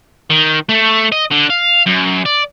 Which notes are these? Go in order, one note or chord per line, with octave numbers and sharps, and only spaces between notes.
D#3
A3
D#5
D3
F5
F#2
D5